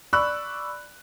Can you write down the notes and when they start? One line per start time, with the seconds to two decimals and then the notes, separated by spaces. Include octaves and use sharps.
0.13 D5 B5 C#6 E6 F#6